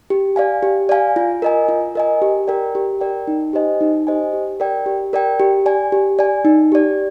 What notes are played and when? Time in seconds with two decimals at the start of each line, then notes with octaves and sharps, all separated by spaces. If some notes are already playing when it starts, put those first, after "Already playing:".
0.10 G4
0.36 D5 F5 G#5
0.63 G4
0.89 D5 F5 G#5
1.16 F4
1.42 A#4 D#5 G#5
1.69 F4
1.95 A#4 D#5 G#5
2.22 G4
2.48 A#4 D5 G5
2.75 G4
3.01 A#4 D5 G5
3.27 D#4
3.53 G4 C5 D#5 G#5
3.81 D#4
4.07 G4 C5 D#5 G#5
4.33 G4
4.60 A#4 D5 G5
4.86 G4
5.13 A#4 D5 G5
5.40 G4
5.66 D5 G#5
5.92 G4
6.19 D5 G#5
6.45 D#4
6.72 G4 D5